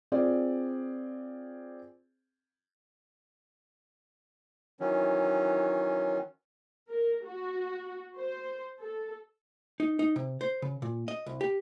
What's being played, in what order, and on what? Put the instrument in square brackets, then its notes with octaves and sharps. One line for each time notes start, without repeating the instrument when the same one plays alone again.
[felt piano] C4 F4 G#4 D5
[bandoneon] D#3 E3 F#3 C#4
[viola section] A#4
F#4
C5
A4
[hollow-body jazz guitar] D#4
D#4
C3
C5
C#3
A#2
D#5
C2
G4